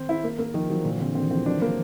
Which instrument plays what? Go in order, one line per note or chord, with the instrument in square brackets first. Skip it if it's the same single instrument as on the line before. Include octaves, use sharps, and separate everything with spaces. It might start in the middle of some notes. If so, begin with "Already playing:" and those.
Already playing: [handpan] D#3 [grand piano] C4
[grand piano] E4
A#3
A#3
[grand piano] D#3 [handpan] F3
[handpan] E3 [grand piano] F#3
[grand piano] A#2 [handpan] D3
[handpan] D3 [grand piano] C4
[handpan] D#3 [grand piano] C4
[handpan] E3
[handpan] F3 [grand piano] C4
[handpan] F#3 [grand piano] D4
[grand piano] A#3